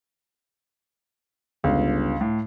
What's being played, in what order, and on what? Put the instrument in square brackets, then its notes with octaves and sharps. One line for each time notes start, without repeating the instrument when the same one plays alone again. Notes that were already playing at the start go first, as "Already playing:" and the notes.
[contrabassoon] G1 [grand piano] C#2
[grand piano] A2